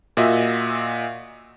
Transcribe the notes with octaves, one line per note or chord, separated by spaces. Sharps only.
A#2 F#4 D#5 E5